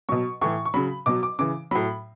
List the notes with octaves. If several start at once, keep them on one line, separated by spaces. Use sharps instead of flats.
B2 F#3 C#6
A2 E3 C#6
C#6
C#3 F#3 B5
B2 F#3 D6
D6
C#3 E3 D6
A2 F#3 B5